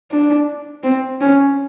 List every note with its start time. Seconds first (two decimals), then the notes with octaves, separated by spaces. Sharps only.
0.11 D4
0.84 C4
1.21 C#4